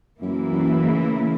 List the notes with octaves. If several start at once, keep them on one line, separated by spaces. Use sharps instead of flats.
F#2 E3 A#3 E4
F#2
C#3